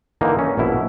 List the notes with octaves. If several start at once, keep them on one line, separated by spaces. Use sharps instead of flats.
D3 E3 A#3 D#4
C#4
A#1 B2 E4